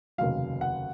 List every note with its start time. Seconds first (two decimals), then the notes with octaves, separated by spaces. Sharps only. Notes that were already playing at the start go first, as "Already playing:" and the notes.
0.18 F1 D#2 C#3 F#3 F5
0.61 F#5